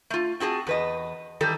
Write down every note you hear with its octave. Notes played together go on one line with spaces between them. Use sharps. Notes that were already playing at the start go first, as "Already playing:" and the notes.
A3 F4
C4 F#4 G#4 A5
E2 B4 D#5
D#3 E3 G3 A4